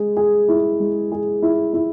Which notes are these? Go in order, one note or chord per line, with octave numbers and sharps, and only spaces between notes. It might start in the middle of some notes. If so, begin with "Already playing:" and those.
Already playing: G#3 G#4
G#4
E4
G#3
G#4
E4
E4